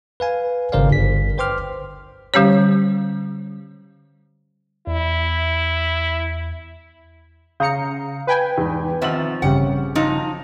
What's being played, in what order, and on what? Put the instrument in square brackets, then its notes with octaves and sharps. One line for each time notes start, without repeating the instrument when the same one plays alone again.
[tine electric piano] B4 F5 G#5
G#1 C#3 A#4 C5 D5 F5
G1 B6
B4 C5 G5 C6 D6 F6
[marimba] D3 G3 C#4 G4 C#5
[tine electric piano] E2 [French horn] E4
[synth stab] C#3 A#5 C#7 [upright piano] F5 D#6 G6
[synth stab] B4 G5 G#5
[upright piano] E2 G#2
[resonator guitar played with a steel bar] D#3 F3 E5 [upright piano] C4 F#5 F#7
[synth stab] A1 G2 C#3 [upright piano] C4 C#4 G4 [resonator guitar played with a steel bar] F#5
[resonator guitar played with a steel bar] F3 F#3 D#4